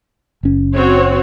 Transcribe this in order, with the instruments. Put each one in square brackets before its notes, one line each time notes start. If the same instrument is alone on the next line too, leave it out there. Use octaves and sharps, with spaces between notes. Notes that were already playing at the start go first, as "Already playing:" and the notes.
[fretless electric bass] F#1 C#4
[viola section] C4 F#4 C#5